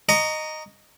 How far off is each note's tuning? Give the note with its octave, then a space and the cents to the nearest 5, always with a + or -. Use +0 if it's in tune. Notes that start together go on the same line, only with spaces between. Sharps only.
D#5 -10 A#5 -5 C#6 +30